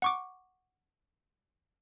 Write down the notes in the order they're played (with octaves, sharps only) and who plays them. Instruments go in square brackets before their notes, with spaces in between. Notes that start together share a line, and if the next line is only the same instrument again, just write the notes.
[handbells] F#5 C#6 D6